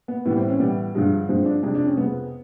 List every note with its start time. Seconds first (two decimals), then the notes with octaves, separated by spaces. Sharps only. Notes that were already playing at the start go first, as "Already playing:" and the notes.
0.08 B3
0.25 A2 E3 G3 B3
0.37 C4
0.49 C#4
0.59 A2 E3 G3 B3
0.94 G2 D3 F3 G#3
1.29 G2 D3 F3 G#3 C4
1.45 D4
1.63 F2 C3 F3 G#3 D4
1.75 D4
1.86 C#4
1.97 F2 C3 F3 G#3 B3